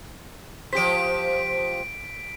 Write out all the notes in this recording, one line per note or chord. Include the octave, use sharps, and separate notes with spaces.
F3 G4 C5 B6 D7